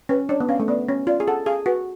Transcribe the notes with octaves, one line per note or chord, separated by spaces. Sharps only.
C#4 B4
D4 C#5
B3
C#4 F5
A3
B3 D5
C#4 C#5
F4 D5
G#4
A4 F#5
G#4 F5
F#4 B4